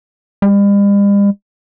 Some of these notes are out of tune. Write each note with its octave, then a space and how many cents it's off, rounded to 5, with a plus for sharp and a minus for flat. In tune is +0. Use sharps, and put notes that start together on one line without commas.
G3 +45